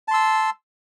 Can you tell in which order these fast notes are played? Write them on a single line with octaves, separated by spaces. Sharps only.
A5 C6 E6